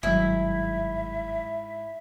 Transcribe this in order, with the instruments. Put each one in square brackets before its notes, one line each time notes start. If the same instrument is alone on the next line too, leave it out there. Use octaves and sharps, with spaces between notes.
[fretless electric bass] G1 D#3 F#3 [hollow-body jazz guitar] G#2 [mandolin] E4 [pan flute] E5